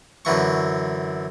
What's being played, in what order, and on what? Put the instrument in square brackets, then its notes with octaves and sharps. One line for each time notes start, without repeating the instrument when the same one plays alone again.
[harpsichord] F#2 D3 E3 C#6